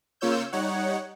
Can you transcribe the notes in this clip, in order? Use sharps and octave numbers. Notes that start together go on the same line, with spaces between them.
C#3 A#3 F4 C#5 E6 G6
G3 D#4 C#5 F#5